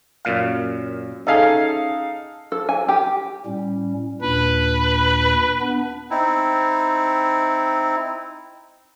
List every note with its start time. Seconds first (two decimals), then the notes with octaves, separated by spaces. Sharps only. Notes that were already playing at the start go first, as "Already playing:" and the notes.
0.25 F#2 A#2 F5
1.27 C#4 D#4 G#4 A4 E5 F5
2.52 A4
2.69 G#5
2.88 G4
3.46 A2 G3 C#4
4.22 D#2 A#2 D4 B4
5.61 B3 D4
6.11 C4 D#4 E4